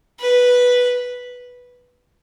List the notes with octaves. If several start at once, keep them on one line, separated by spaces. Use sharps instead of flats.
B4